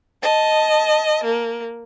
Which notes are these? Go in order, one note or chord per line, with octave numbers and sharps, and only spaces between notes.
D#5 A5
A#3